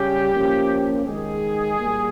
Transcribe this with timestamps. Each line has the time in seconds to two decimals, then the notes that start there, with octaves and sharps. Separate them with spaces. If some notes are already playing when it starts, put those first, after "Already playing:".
Already playing: C#3 G3 C#4 G4
0.32 F3 A#3 C#4
1.05 D#3 G#3 D#4 G#4
1.79 A#2 G3 A#3